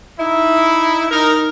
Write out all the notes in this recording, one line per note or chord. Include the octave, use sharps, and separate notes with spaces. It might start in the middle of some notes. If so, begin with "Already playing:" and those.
D#4 E4
D#4 A#4